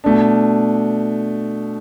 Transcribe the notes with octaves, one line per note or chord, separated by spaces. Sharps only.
B2 A3 D4